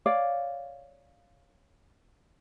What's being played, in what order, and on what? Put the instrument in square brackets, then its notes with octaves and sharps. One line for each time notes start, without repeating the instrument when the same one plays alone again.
[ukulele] C#5 D5 F5